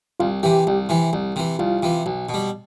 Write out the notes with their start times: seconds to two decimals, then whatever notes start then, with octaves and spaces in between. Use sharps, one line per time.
0.20 C2 F4 F5
0.43 C3 E3 G4 G5
0.67 C2
0.89 C3 E3
1.13 C2
1.36 C3 E3
1.59 C2 F4 F5
1.83 C3 E3
2.06 B1
2.29 B2
2.34 G3